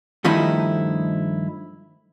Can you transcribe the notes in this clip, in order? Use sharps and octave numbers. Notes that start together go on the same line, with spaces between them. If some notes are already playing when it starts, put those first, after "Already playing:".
G2 D#3 F3 A3 D#4 E4